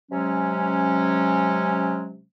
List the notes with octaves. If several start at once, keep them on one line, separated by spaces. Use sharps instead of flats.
C3 F#3 G#3 C#4